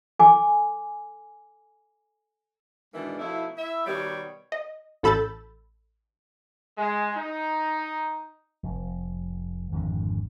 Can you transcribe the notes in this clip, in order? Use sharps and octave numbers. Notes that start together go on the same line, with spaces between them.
A4 G#5 D6
G#2 B2 D#3 E3 G#3 D4
B2 F3 A3 D#4 E4
E4 E5
B2 D#3 G3 B3 G4 C#5
D#5
A1 A4 B5 E6 G6 A6
G#3
D#4
F1
G#1 F2 G#2 D3